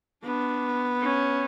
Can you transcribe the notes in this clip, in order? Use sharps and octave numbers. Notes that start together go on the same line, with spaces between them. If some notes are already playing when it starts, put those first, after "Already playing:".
B3 D4
C#4